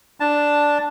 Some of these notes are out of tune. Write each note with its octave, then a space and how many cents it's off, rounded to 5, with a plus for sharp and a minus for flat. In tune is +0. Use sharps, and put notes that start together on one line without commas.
D4 +0 A5 +0